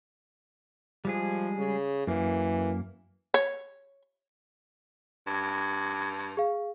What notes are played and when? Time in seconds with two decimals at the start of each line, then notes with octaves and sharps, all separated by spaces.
1.05 F3 G3 G#3 G#4
1.58 C#3
2.07 F#2 E3 A#3
3.34 C#5
5.27 G2
6.37 G#4 F5